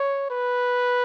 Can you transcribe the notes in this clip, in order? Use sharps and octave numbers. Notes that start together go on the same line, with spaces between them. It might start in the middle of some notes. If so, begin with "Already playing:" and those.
Already playing: C#5
B4